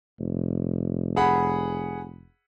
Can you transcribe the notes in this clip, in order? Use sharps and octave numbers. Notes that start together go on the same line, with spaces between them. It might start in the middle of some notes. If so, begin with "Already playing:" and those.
F1
G#4 F#5 B5